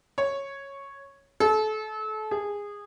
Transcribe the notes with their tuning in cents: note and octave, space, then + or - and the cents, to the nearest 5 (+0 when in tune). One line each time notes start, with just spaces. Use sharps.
C#5 -5
A4 -30
G#4 -20